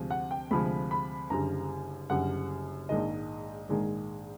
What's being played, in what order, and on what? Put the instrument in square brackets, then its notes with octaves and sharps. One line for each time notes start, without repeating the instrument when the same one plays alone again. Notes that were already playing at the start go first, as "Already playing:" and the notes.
Already playing: [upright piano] D2 C3 F3 G#3
F#5
G5
D2 C3 F3 G#3 B5
B5
F#1 F#2 D3 G3 A#5
F#1 F#2 D3 G3 F#5
A#1 G#2 D#3 G#3 D#5
A#1 G#2 D#3 G#3